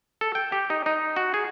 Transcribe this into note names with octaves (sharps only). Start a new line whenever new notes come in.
A4
G5
G4
D#4
D#4
F#4
G#4